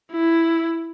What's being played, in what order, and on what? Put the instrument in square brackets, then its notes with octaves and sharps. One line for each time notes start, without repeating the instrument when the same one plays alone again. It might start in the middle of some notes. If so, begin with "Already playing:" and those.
[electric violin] E4